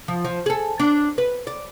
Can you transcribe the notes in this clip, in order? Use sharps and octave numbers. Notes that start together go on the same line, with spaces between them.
F3
F3
G#4 A4
D4
B4
D5